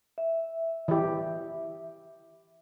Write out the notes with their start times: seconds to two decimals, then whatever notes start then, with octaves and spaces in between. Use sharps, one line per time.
0.18 E5
0.88 E3 G4